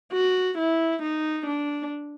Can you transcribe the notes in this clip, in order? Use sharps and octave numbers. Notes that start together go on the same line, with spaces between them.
F#4
E4
D#4
D4